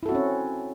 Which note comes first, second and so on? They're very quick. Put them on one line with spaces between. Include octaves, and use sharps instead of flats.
E4 A4 F#4 C4 C#4